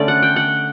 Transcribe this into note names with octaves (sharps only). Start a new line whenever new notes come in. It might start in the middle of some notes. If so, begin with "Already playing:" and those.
Already playing: D3 A3 C#4 D5
F#5
G5
F#5